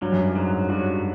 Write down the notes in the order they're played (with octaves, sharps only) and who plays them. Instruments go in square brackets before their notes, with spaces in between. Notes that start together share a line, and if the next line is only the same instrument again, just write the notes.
[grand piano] G2 [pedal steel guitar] F#3
[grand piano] F#2
G2
[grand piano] G#2 [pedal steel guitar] F#3
[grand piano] G2 [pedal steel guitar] F#4